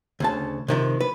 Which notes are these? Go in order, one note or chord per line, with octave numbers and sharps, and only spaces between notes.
D2 C#3 A5
C3 D#3 F3
B4